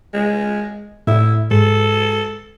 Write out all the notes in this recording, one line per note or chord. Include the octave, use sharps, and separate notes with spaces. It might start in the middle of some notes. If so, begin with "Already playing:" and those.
G#3
A2 E4
G#2 A4